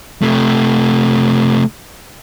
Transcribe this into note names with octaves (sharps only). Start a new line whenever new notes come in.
C3 A3